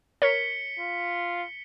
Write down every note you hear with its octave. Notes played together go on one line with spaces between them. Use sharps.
A#4 C#5 B6 C#7 G7
F4